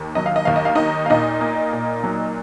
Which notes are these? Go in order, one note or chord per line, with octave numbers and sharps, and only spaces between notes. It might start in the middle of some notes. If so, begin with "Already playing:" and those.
Already playing: D#2
F#3 D#5
F5
D#5
D#2 F5
D#5
F5
D#3 D#4 D#5
F5
A#2 D#4 D#5
A#3
A#2
F#3